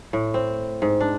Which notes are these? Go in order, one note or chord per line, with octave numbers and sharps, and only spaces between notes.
A2
C4
G#2
D4